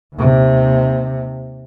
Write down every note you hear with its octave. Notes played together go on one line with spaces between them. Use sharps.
D#2 C3